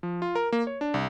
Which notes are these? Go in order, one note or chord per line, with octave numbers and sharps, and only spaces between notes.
F3
F4
A#4
A#3
C#5
D4
C2